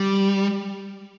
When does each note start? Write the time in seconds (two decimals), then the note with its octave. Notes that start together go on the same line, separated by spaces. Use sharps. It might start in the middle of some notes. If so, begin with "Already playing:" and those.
Already playing: G3